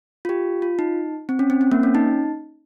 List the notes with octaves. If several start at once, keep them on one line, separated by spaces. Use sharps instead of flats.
F4
G4
F4
D#4
C4
C#4
C4
C4
A#3
C#4
D#4